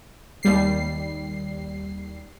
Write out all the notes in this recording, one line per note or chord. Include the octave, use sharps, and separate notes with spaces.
D#2 G3 C7